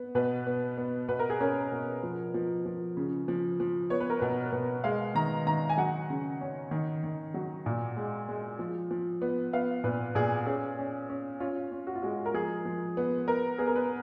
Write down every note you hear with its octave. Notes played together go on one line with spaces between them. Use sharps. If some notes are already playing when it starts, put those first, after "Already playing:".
Already playing: B3
B2 B4
B3
B3
B2 B4
A#4
G#4
C#4 A#4
B2
F3
F3
F3
C#3
F3
F3
B3 C#5
B4
A#4
B2 B4
B2
G#3 F5
D#3 A#5
D#3 A#5
G#5
F#3 F#5
C#3
C#4
D#3
D#3
F#3
A#2
G#3
G#3
F3
F3
B3
B3 F5
A#2 B4
A#2 G#4
C#4 G#4
C#4
C#4
C#4 F4
C#4
F#4
F4
G#3 F#4
A#4
F3 G#4
F3
B3
B3 A#4
B3 G#4
A#4
B4